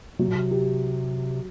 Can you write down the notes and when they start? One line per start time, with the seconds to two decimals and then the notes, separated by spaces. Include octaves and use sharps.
0.19 C3 F#3
0.28 A#2
0.36 C3
0.51 G4